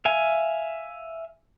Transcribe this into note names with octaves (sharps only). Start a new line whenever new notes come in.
E5 F5 G#5